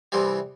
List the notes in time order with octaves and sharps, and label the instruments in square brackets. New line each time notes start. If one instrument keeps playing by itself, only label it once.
[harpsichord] C2 C3 E3 G3